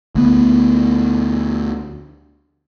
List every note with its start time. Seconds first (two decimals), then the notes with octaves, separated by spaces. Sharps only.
0.15 D2 B3